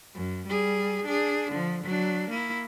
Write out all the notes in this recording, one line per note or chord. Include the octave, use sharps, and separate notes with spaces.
F#2
G3 G#4
D4 G#4
D3 F3
F#3 D4
A#3 E4